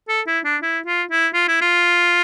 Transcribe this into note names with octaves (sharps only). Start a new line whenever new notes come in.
A4
E4
D4
E4
F4
E4
F4
E4
F4